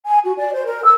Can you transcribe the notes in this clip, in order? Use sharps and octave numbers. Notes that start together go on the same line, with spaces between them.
G#5
F#4
D5
C5
A#4
E6